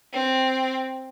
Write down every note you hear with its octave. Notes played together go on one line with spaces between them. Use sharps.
C4